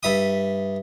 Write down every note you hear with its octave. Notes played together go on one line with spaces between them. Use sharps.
G2 E5 D#6